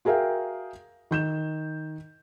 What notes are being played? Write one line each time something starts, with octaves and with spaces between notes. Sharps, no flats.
F#4 G#4 A#4 E5 F5 G5
D#3 G6 E7